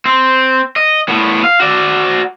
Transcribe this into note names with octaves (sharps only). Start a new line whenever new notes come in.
C4
D#5
A2 B3
F5
F#4 D5